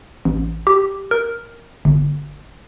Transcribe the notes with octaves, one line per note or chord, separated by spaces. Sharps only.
A1
G4
A#4
G1